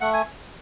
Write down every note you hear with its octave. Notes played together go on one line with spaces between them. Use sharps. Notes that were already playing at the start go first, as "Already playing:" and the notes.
A3 F#5
G#5